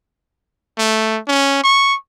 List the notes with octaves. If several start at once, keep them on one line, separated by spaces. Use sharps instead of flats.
A3
C#4
C#6